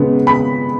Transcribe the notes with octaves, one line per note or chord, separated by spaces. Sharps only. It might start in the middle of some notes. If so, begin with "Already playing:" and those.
Already playing: C#3 G#3 B3
B5